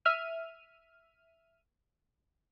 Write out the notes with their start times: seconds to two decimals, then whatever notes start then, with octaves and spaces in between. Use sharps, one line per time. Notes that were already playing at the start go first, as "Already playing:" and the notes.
0.05 E5 F6 D#7